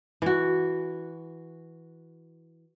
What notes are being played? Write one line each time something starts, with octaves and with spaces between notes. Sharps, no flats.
E3 F#4